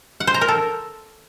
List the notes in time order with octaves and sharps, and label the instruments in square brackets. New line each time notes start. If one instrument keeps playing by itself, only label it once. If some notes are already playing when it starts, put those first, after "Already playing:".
[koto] F#5
C5
A#5
A#4
A4